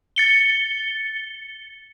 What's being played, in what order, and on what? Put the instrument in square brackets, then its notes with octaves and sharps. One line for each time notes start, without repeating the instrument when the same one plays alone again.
[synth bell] A6 C#7 G7